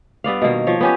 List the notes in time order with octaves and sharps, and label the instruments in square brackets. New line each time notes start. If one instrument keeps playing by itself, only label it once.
[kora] G2 B3 D5 F5
B2 D#3 A#3
F3 C#5
B3 C#4 G4